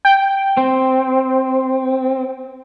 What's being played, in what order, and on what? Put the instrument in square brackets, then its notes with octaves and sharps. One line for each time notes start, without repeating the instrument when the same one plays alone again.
[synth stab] G5
[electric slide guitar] C4